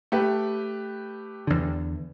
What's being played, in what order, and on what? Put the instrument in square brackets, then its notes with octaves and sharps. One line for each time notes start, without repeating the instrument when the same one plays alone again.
[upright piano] A3 G4 B4
[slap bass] E2 D3